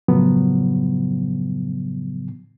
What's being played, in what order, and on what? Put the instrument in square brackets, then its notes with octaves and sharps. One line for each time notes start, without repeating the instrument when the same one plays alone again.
[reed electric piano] F#2 A2 C#3 F3 F#3 B3